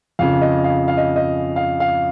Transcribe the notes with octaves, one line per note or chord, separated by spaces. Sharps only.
F2 C#3 F3 F5
D#5
F5
F5
D#5
D#5
F5
F5